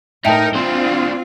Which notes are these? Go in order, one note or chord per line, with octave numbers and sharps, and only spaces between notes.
A2 D#4 A#4 E5 G5 A5
C4 D4 F4 C5